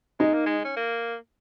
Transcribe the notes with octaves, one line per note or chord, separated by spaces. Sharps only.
G#3 D#4
A#3
G#3
C#4
A#3